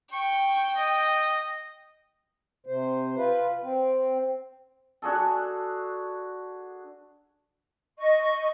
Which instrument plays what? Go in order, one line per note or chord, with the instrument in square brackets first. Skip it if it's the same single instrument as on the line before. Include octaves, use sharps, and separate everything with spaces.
[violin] G5 [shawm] C#6
[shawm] D#5
[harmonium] C3 C5
F4 B4
C4
[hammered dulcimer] D4 F#4 G#4 A4
[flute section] D#5 C#6